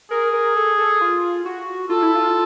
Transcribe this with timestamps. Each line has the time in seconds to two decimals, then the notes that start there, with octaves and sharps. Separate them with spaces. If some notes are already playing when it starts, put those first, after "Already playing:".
0.10 G#4 A#4
0.33 A#4
0.56 A4
0.78 A4
1.01 F4
1.45 F#4
1.89 F4 A4
2.02 E4
2.15 F4